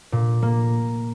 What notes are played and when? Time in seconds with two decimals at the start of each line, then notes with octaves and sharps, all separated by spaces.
0.12 A#2
0.42 A#3